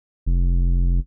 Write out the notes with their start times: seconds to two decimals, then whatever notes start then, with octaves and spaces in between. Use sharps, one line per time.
0.26 F1